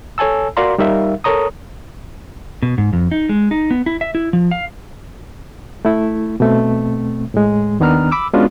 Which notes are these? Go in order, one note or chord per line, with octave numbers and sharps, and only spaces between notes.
A4 C#5 G#5 A5 E6
F#4 A#4 D5 F5 A#5 C6
G3 D#4 A#4 E5 F5
A4 A#4 C#5 A#5 D#6
B2
G#2
F2
D#4
G#3
D#4
B3
E4
E5
E4
F3
F5
A3 E4
B2 A3 C4
A2 G#3
D#2 D#3 B3 D4 A#5 F6
B5 D6 E6
G#3 B3 C#4 D4 F4 F#4